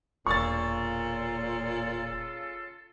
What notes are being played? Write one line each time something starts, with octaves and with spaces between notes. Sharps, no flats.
E1 A#2 C#3 F4 A4 C#6 A6